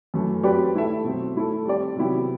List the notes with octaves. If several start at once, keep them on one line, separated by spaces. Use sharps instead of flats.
F#2 E3 A3
F#3 C4 G4 B4 D5
A3 E4 A4 E5
B2 F#3 C4
A3 E4 A4
G3 C4 G4 D5
C3 F#3 B3 E4 G4